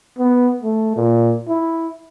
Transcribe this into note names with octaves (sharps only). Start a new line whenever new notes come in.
B3
A3
A#2
E4